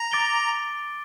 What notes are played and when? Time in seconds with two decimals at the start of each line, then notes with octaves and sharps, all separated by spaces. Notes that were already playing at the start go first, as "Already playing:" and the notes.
Already playing: A#5
0.12 D6 A6 D7 G7